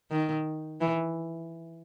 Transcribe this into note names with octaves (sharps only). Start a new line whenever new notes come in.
D#3
E3